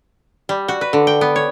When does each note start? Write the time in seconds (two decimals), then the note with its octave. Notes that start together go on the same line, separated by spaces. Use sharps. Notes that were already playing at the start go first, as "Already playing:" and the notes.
0.49 G3
0.68 F#4
0.81 B4
0.93 D3
1.07 G5
1.21 B3
1.36 C#5